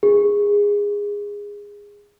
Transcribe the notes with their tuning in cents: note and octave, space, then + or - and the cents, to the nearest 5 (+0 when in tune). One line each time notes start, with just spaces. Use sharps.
G#4 -20